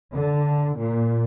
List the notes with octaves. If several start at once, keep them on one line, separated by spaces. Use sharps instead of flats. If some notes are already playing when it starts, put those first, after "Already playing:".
D3
A#2